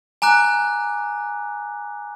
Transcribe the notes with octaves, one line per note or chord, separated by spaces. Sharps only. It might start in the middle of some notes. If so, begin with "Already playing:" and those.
G#5 A#5 D6 F#6